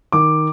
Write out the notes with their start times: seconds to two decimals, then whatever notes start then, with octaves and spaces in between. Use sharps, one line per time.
0.12 D#3 D6